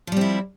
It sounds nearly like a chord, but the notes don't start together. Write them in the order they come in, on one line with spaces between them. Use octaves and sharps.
F3 G3 C4 E4